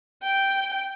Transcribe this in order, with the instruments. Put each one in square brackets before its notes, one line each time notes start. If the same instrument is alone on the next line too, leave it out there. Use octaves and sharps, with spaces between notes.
[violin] G5